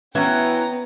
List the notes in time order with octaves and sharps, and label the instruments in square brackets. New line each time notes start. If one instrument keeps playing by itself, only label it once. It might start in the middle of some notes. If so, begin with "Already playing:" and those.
[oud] E3 F#4 [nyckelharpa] B3 [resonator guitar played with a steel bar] C#4 [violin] G5 A#5